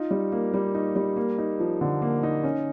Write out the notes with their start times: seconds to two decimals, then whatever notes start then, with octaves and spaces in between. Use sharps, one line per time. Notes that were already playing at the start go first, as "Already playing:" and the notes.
Already playing: D#4 F4
0.11 G3
0.32 A#3
0.54 G3
0.75 D#4
0.96 G3
1.16 A#3
1.38 D#4
1.60 F3
1.81 D3
2.02 A#3
2.23 D#4
2.44 C#4